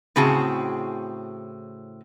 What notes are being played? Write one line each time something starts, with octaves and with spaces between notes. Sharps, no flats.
A2 C#3 C4 F#4 G#4 A5